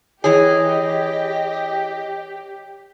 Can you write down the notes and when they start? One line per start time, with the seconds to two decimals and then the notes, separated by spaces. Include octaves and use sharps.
0.24 E3 G4 G#4 C#5 D#5